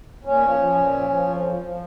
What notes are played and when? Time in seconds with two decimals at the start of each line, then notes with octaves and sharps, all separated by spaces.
0.24 A#2 C#4
0.42 F3
0.59 F3
0.75 A#2
0.93 F3
1.10 F3
1.27 F2
1.44 F3
1.62 F3